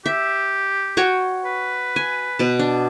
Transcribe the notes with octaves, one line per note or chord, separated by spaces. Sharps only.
G4 E5
F#4 C#5 G5
B4
G#5
B2 A5
D4